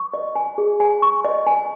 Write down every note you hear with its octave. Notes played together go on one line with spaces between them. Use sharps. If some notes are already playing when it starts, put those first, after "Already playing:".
Already playing: C#6
D#5
G#5
G#4
G#5
C#6
D#5
G#5